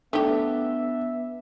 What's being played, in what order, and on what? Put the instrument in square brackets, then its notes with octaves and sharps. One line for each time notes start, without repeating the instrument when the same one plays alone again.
[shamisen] A3 G4 [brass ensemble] B3 E5 [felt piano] D4